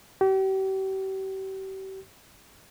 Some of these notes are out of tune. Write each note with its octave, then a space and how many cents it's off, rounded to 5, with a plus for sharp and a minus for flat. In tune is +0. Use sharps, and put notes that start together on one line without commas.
G4 -40